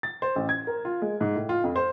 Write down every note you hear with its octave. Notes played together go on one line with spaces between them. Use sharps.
A6
C5
A1
G#6
A#4
F4
G#3
G#2
A2
F4
F2
C5